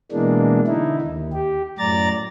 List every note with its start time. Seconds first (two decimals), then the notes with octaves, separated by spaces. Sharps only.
0.12 B2 E3 G#3 A#3 D4
0.67 D3 D#4 E4
1.01 D#2
1.33 G4
1.79 F#2 A2 D5 A#5 A6